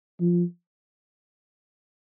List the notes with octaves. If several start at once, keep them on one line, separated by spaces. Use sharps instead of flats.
F3